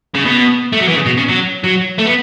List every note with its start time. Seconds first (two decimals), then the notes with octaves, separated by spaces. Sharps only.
0.15 C#3
0.25 B2
0.72 A3
0.80 F#3
0.88 E3
0.94 C#3
1.06 B2
1.18 C#3
1.29 F#3
1.64 F#3
1.98 A3
2.05 B3